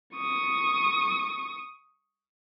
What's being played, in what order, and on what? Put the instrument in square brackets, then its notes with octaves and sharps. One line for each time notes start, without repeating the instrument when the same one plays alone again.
[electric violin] C#6 D#6